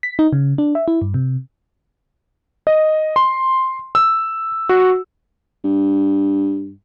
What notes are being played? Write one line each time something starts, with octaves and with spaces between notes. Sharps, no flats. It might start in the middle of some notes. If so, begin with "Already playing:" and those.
B6
D#4
C#3
D4
E5
E4
G2
C3
D#5
C6
E6
F#4
G2